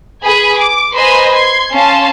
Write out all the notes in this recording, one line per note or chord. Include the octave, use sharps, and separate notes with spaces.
G#4 B4 G#5 B5
D6
B4 C5 D#5 G#5 A#5 C6
C6 G#6 C7
C#4 F5 A5 C6